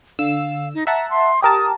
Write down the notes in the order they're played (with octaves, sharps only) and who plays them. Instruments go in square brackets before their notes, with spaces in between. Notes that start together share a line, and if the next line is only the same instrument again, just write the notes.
[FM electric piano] D3 E6 [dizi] F5
[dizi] D#4
[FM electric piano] E5 F#5 A5 [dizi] A#5
[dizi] C6
[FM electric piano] G4 A#4 A5 [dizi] D#6